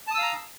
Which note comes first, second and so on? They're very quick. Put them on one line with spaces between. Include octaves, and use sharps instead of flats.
A5 D#6 E6 F5 A#5